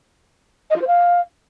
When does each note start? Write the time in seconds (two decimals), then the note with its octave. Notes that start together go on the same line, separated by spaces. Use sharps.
0.70 D#5
0.76 F4
0.81 C5
0.87 F5